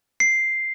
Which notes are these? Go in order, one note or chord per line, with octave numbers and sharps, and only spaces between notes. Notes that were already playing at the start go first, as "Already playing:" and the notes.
C7